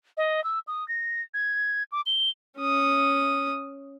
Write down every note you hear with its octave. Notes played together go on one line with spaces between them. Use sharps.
D#5
E6
D#6
A#6
G#6
D6
G7
C#4 D#6